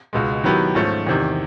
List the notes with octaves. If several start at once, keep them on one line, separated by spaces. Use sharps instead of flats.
C#2 B2 G#3
D#3 F#3 B3 E4 G4
G#2 F3 A3 C#4
E2 C3 D#3